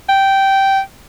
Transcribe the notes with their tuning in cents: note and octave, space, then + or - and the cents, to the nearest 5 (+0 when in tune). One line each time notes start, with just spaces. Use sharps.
G5 -10